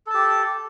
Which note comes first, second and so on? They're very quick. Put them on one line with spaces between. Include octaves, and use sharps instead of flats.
A4 A5 G4